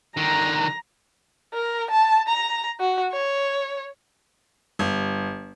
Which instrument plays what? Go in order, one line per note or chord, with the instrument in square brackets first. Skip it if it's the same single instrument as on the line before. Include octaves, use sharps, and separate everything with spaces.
[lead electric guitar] D3 D#3 [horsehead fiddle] A#5
[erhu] A#4
A5
A#5
F#4
C#5
[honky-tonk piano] G1